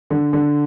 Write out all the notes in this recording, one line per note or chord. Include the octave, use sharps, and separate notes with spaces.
D3
D3